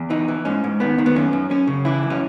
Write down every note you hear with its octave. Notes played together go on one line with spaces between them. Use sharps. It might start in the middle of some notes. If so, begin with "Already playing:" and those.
Already playing: E2
E3 D#4
E3
G#2 C#4
G#2
D#3 B3
D#3
B3
F#2 C#4
F#2
F#2 C#4
C#3
E3 E4
F#2
C#4